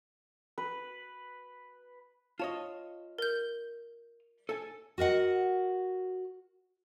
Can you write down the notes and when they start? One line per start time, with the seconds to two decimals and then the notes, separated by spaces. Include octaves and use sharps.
0.58 B4
2.40 F4 C#5 D#5 A5
3.19 A#4 G6
4.49 A4 G#5
4.98 F#4 A#4 D#5 F#5